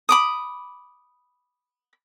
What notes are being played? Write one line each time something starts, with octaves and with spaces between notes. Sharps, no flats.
B5 D6 D#6